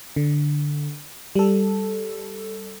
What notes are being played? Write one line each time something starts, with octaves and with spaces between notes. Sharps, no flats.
D3
G3 A4